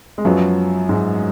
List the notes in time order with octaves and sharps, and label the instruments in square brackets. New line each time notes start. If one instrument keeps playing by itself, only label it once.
[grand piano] G#3
[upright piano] F#2 F3 B3 F4 [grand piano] F#3
[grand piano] G#2 G#3